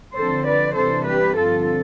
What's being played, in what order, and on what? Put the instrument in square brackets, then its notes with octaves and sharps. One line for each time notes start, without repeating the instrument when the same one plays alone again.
[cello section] D3 F3 C4 A4 C5
B4 D5
C3 E3 G3 D4 A4 C5
G4 B4
G2 D3 F3 C4 F4 A4